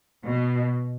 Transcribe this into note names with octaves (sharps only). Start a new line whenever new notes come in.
B2